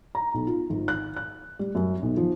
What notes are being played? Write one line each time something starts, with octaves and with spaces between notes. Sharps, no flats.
A#5
B1
F4
G#1
F#6
F#6
G3
F#2
B1
F3